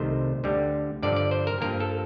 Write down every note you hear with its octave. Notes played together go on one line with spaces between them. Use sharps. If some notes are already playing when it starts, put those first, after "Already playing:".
Already playing: C2 C3 D#3 A3 C5
D2 D3 G3
G2 D3 F3 D5
D5
C5
A#4
G2 F3 A#3 A#4
A4